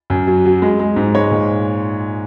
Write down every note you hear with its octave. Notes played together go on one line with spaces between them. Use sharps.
F#2
F#3
F#3
G#3
G#3
G#2
G#3 C#5
A#2